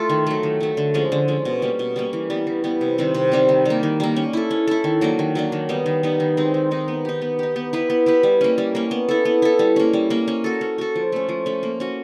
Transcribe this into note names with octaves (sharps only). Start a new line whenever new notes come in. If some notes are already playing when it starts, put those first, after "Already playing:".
Already playing: A3 F4 A4
D#3
F#3 A3
D#3
F#3 A3
D3
F3 G#3 C#4
D3
F3 G#3 C#4
B2
G3 A#3 C#4
B2
G3 A#3 C#4
E3
G3 B3
E3
G3 B3
C3
D#3 G3 C4
C3
D#3 G3 C4
D#3
G3 A#3
D#3
G3 A#3
C#4
E4 A4
C#4
E4 A4
D#3
F#3 A#3 D4
D#3
F#3 A#3 D4
D#3
G3 B3 D#4
D#3
G3 B3 D#4
D#3
G#3 C4 D#4
D#3
G#3 C4 D#4
B3
D#4 G4
B3
D#4 G4
B3
E4 G4 B4
B3
E4 G4 B4
G3
A#3 C#4
G3
A#3 C#4
B3
E4 A4
B3
E4 A4
G3
A#3 C#4
G3
A#3 C#4
C#4
F#4 A4
C#4
F#4 A4
F3
A3 C#4
F3
A3 C#4
A#3
C#4 F#4